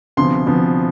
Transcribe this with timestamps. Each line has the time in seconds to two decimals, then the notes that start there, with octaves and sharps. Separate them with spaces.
0.17 D2 C3 F3 B3 C6
0.47 D2 C3 F3 B3